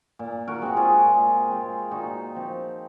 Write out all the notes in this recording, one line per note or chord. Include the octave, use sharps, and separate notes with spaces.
A#2
F#4 A#4
G#3 C4 F#4
F4 G#4
A#2
G#3 C4
A#2 D#4 F#4
F3 C4